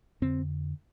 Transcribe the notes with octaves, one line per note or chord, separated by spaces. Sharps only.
F2 D3 C4